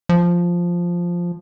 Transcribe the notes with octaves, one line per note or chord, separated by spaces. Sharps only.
F3